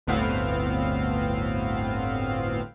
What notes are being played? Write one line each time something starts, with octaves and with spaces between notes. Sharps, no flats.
G1 D2 A2 B3 C4 F5